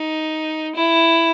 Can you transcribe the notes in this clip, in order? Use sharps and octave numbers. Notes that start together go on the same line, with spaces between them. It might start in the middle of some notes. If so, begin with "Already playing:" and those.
Already playing: D#4
E4